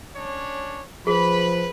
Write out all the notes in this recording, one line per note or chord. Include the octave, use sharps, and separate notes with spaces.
C#4 D4 C#5
F3 G#4 B4 B5